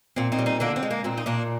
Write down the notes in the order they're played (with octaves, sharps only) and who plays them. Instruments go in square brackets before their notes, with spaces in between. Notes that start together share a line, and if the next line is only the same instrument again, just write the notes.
[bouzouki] A#2 C4
C4 D#4
G3
C4 D#4
D3 A#3 D4
C4
G#3
A#3
A#2 C4
D#4
A#2 A#3 D4